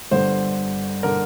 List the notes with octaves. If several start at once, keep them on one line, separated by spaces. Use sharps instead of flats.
G1 G2 D3 C5
D3 A#4